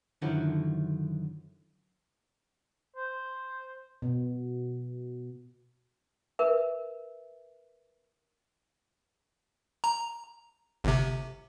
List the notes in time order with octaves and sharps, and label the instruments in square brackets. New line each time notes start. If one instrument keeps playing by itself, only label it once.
[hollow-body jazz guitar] F#2 D3 D#3 F3 F#3 E4
[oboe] C5
[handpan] B2
[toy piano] A#4 B4 E5
[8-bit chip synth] A#5
G1 C3